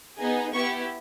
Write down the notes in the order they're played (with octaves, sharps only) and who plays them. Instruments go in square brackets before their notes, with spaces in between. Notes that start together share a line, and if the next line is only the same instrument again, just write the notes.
[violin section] B3 D#4 G#4
B3 E4 G4 C#6